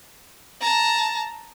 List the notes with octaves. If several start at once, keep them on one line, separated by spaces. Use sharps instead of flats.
A5 A#5